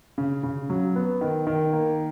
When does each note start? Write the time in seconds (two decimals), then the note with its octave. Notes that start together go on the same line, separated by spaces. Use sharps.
0.18 C#3
0.43 C#3
0.70 F#3
0.96 B3
1.21 D#3
1.47 D#3
1.73 A#3